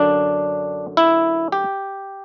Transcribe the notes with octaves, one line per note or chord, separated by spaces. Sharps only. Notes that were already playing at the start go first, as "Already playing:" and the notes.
Already playing: F#2 D3 D4
E4
G4